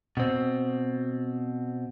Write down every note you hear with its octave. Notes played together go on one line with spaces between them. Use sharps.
B2 C4